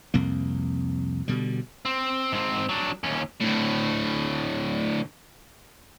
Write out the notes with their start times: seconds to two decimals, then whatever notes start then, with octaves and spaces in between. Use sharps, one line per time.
0.14 C2 F2 C3 A#3
1.28 B2 D3 G3
1.85 C4
2.32 G#2 C4
2.69 F#3 D4
3.04 D#2 C#4
3.40 D2 A2